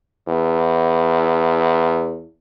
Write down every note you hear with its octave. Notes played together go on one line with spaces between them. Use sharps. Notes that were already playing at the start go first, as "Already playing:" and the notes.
E2